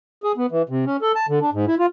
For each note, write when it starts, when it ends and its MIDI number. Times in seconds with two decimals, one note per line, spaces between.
0.23 0.32 68
0.37 0.46 59
0.52 0.62 52
0.69 0.85 48
0.86 0.97 61
1.02 1.12 69
1.15 1.26 81
1.29 1.39 50
1.41 1.50 62
1.53 1.65 44
1.67 1.75 64
1.79 1.86 65